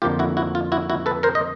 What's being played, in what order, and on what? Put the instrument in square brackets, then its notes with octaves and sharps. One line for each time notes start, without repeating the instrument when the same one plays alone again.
[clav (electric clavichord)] F2 D3 F3 A#3 F4 G4
E4 F#4
E4 F#4
F4
E4 F#4
E4 F#4
A4 B4
A#4 C5
D#5